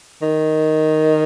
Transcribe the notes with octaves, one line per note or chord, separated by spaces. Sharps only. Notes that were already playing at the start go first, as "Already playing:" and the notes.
D#3